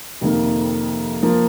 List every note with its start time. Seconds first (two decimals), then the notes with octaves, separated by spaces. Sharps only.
0.21 F2 C3 D#3 A#3
1.23 F3 A#3